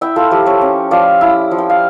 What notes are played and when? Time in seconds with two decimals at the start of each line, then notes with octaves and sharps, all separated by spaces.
0.01 E4 E5 G5
0.16 F4 A4
0.31 F3 G4
0.46 A4 C#5
0.61 C#4
0.91 F3 D5 F5
1.21 E4
1.51 F3
1.58 G5
1.70 F5